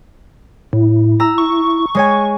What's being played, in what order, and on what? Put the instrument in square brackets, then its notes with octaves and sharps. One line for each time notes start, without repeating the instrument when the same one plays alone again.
[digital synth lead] A2 [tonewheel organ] E4
[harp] A#5 E6
[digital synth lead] C#6
[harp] G#3 C#5 G#5